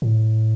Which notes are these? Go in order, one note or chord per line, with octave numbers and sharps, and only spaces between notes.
A2